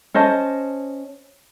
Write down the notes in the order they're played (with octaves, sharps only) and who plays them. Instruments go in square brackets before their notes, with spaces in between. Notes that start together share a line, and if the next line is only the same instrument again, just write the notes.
[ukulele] C#4 C5 D#5 A5